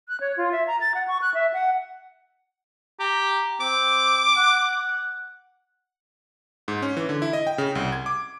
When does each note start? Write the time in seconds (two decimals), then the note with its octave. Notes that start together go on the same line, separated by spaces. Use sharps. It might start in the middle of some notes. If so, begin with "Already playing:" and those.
0.08 F#6
0.20 C#5
0.37 F4
0.52 E5
0.67 A#5
0.80 A6
0.95 F#5
1.08 C#6
1.22 F#6
1.34 E5
1.53 F#5
3.00 G4 A#5
3.60 C4 D6
4.36 F#5
6.68 G#2
6.82 C#4
6.97 E3
7.09 D3
7.22 E4
7.33 D#5
7.47 G5
7.58 C#3
7.75 C2
7.92 G#6
8.06 D6